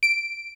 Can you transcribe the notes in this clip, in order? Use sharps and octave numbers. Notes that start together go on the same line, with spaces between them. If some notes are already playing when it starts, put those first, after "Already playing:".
D7